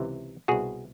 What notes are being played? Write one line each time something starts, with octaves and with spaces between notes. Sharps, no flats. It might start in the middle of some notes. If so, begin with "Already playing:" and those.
Already playing: C#2 C3 E3
C2 B2 F#4 G#4